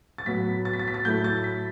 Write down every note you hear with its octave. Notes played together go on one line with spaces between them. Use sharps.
A6
A2 F#3 B3 B6
A6
B6
A6
B6
A6
A2 F#3 A3 E4 G6
A6
B6